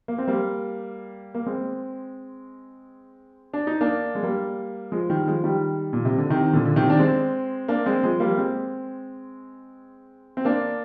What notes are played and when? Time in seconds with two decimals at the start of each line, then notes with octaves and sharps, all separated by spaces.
0.08 A#3
0.18 C4
0.27 G3 A#3
1.34 A#3
1.46 G#3 C4
3.54 D4
3.67 D#4
3.81 A#3 D4
4.15 G#3
4.23 G3 A#3
4.92 F3 G#3
5.10 D#3 G3
5.26 F3 G#3
5.44 D#3 G3
5.93 A#2
6.05 C3
6.18 D3
6.30 C3 D#3
6.53 A#2 D3
6.65 D3
6.76 C3 D#3
6.90 D4
6.99 G#3 C4
7.68 A#3 D4
7.86 G#3 C4
8.03 F3 G#3
8.20 G3 A#3
8.37 G#3 C4
10.37 C4
10.45 A#3 D4